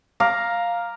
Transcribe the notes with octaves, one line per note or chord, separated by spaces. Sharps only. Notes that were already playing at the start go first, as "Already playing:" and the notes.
F5 A#5 D6